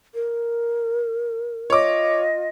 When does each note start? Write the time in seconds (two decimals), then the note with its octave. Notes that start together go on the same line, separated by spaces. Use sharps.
0.15 A#4
1.70 F4 C#5 D#5 D6